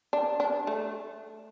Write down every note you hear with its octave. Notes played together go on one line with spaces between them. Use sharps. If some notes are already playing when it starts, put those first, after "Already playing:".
D4
D4
A3